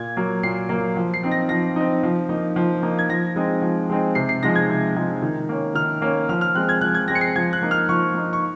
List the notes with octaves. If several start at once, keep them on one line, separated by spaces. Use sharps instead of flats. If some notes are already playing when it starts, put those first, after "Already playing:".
Already playing: A#2 G#6
F#3 A#3
A#2 C7
F#3 A#3
F3
C7
C4 D#4
A#6
F3 A#6
C4 D#4
F3
A#3 D#4
F3
A#3 D#4
G#6
F3 A#6
G#3 C4 D#4
F3
G#3 C4 D#4
C3 C7
C7
F3 G#3 D#4 A#6
G#6
C3
F3 G#3 D#4
D#3
A#3 C#4
D#3 F6
A#3 C#4
F3 F6
F6
G#3 C4 F#6
G#6
F3 F#6
G#6
G#3 C4 A#6
C#7
C7
F3 G#6
F#6
A#3 D#4
F6
F3 C#6
A#3 D#4
C#6